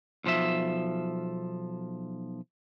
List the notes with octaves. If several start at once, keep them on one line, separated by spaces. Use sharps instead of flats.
B1 F3 E5